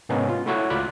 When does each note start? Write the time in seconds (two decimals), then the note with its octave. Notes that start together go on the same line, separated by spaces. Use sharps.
0.09 G#2 C3 A#3 B3 C#4 D#4
0.29 F4
0.46 A3 E4 F#4 C#5 E5 F#5
0.70 C#2 F4 D5 B5 F#6